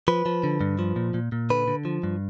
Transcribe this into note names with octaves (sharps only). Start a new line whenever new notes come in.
F3 B4
F3
D3
G2
F3
A#2
A#2
A#2
D3 B4
D3
F3
G2